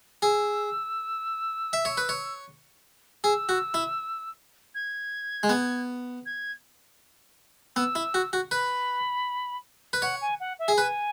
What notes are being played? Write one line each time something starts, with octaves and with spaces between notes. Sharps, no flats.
G#4 E6
E5
C#5
B4
C#5
G#4 E6
F#4
E4
G#6
G#3
B3
G#6
B3 E6
E4
F#4
F#4
B4 B5
B4
C#5 F#5
G#5
F#5
E5
G#4
B4 G#5